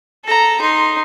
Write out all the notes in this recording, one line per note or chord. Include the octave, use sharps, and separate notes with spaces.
A4 A#5
D#4 C6